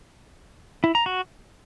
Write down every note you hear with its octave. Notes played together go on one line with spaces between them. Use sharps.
E4
A#5
F#4